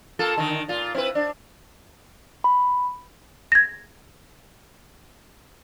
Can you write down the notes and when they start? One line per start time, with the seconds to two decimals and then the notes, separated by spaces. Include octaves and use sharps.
0.19 A#3 F4 A4
0.38 D3 D#3
0.68 A#2 F4
0.95 C4 E4 B4
1.15 D4
2.44 B5
3.52 G#6 A#6